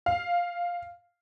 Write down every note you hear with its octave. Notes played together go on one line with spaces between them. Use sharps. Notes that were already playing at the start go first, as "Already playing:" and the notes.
F5